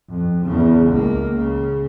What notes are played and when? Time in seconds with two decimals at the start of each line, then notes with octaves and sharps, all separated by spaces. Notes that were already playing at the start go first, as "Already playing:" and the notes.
0.10 F2
0.44 E2 C#3
0.88 C#2 A#3
1.39 C#3